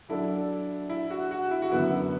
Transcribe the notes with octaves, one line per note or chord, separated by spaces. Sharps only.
F#3 D4 E4 A4 D5
E4
F#4
F#4
E4
F#4
F#2 D3 B3 E4